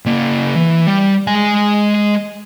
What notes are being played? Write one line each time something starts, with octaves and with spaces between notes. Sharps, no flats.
C#3 A#3
E3
G3
G#3 G#5